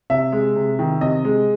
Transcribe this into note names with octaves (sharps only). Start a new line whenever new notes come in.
C3 E5
G#3
C3
D#3
C3 D#5
G#3